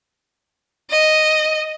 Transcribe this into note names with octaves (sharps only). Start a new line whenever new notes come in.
D#5